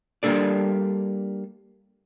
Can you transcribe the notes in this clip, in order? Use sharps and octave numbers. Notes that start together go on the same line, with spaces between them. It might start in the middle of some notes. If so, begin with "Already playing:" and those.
G3 A#3 D4 A4 D5